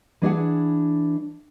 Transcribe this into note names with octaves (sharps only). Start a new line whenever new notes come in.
E3 D4 G#4 F#5